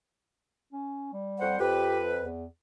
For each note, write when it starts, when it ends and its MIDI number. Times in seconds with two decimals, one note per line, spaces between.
0.73 1.12 61
1.13 1.56 55
1.40 1.57 41
1.40 1.57 72
1.40 1.57 78
1.60 2.25 41
1.60 2.00 67
1.60 2.25 71
2.22 2.45 40